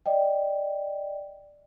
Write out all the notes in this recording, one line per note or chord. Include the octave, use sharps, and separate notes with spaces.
D5 D#5 G5